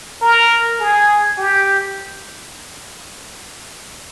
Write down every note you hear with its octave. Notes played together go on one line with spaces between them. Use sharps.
A#4
G#4
G4